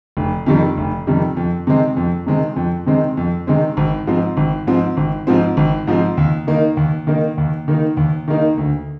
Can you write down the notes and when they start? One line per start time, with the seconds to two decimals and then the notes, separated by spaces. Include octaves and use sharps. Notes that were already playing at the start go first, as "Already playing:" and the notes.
0.17 F1
0.46 F2 C3 D#3 G3
0.77 F1
1.07 F2 C3 D#3 G3
1.37 F2
1.67 C3 D#3 G#3 C4
1.97 F2
2.26 C3 D#3 G#3 C4
2.56 F2
2.86 C3 D#3 G#3 C4
3.17 F2
3.47 C3 D#3 G#3 C4
3.77 G#1
4.07 G#2 F3 C4
4.37 G#1
4.67 G#2 F3 C4
4.97 G#1
5.27 G#2 F3 C4
5.57 G#1
5.87 G#2 F3 C4
6.17 D#2
6.47 D#3 A#3 D#4
6.77 D#2
7.07 D#3 A#3 D#4
7.38 D#2
7.68 D#3 A#3 D#4
7.97 D#2
8.28 D#3 A#3 D#4
8.57 D2